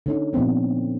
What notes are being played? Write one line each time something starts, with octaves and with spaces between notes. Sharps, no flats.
D3 C#4 D#4
A#2 F3 B3 C4 D4